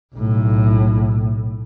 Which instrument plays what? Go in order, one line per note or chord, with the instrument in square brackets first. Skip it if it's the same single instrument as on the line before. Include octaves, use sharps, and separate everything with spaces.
[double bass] B1 A2